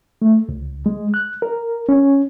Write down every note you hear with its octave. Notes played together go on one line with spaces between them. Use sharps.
A3
C#2
G#3
F#6
A#4
C#4